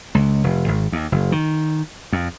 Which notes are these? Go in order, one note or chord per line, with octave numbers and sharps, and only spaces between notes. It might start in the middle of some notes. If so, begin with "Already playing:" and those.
C#2
F1
G#1
D#2
F#1
D#3
F2